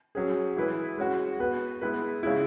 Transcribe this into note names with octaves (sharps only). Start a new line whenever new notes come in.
F#3 C#4 G#4
E3 G#3 E4 G#4 B4
G#3 C#4 F#4
B3 F#4 B4
G#3 B3 E4 B4
C#3 G#3 E4